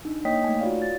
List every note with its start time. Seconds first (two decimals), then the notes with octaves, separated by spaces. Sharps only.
0.05 D4 D#4
0.25 A#3 C#5 D#5 G5 D#6 B6
0.44 A3 D#4 G#5
0.61 F4 F#4 C#5 D5 F5
0.82 A6